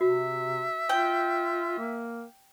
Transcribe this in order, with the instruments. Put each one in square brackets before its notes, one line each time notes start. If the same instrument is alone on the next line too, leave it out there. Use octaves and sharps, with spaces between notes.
[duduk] C3 [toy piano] F#4 [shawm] E5
[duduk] F4 [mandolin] G5
[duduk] A#3